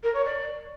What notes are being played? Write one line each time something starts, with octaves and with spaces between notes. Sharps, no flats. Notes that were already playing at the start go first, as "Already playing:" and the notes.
A#4
C#5
D5